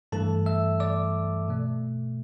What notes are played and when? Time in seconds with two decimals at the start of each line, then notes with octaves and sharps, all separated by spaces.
0.12 G2 E3 A3 A4 A5
0.46 E5 E6
0.80 D5 D6
1.48 B2 A3